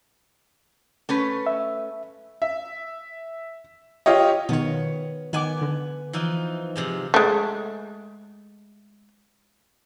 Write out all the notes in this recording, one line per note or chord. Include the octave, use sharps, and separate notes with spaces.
A3 C#4 B4
E5
E5
F4 G4 C#5 D#5
B2 D#3 B3 C#5
D#3 B3 G#5 D6
D3
E3 F3 D#4
C3 F3 G#3
G#3 A3